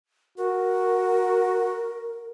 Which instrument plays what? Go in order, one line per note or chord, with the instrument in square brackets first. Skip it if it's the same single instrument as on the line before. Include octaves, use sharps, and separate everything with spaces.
[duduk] F#4 [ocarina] A#4